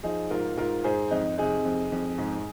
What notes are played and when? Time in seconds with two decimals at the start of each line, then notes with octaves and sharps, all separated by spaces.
0.03 F3 D#4 G#4
0.30 G#2 F4 A#4
0.57 G#2 F4 A#4
0.84 G#2 G#4 C5
1.11 F2 D#4
1.38 C3 D#4 G#4
1.65 F2
1.92 F2
2.18 G#2